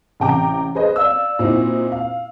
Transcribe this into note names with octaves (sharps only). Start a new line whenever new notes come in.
A1 C3 G5 A#5 D6
G#4 B4 C5 D#5
D5 F5 E6
A#2 C4 D#4 E4 F#4
F5